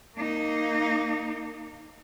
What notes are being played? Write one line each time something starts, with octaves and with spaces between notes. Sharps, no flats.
A#3 D#4